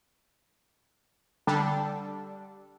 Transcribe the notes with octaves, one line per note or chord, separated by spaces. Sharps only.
D3 G3 D4 A4